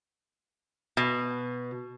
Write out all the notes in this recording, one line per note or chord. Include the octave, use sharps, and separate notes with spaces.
B2